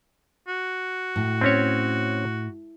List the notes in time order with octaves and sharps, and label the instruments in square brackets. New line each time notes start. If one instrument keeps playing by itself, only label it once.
[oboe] F#4
[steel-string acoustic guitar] A2
[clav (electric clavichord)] C4 C#4 C#5